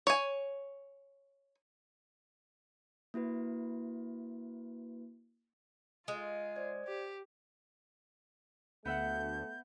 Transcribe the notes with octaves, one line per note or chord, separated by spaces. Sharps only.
C#5 G#5
A#3 E4 F#4 B4
G#3 F4
C5 D5 G#6
G4
D2 A3 B3 E5 F#5 G6